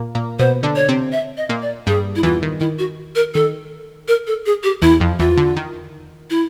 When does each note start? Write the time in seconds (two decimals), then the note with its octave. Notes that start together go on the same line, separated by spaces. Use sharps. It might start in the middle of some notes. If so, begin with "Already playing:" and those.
Already playing: A#2 A#3
0.15 A#2 A#3
0.39 B2 B3 C5
0.63 D3 D4
0.76 C#5
0.88 C3 C4
1.12 E5
1.37 D#5
1.49 A#2 A#3
1.62 D5
1.87 G2 G3 G#4
2.16 E4
2.23 E2 E3 F4
2.42 D#3
2.60 D#3 E4
2.79 F#4
3.15 A#4
3.34 D#3 A4
4.08 A#4
4.27 A4
4.46 G#4
4.63 G4
4.82 E2 E3 E4
5.00 F2 F3
5.19 E2 E3 F4
5.37 D3
5.56 D#3
6.30 E4